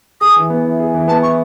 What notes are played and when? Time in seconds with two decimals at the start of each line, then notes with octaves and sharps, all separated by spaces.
0.21 G#4 D#6
0.36 E3
0.50 B3
0.65 E4
0.80 G#4
0.94 E3
1.08 B3 A5
1.23 E4 C#6